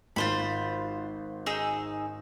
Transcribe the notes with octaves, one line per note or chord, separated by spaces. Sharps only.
G#1 F4 C5 B5 C6 A6
D#4 G#4 E6